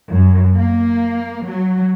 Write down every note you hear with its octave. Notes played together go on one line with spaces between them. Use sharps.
F#2
A#3
F#3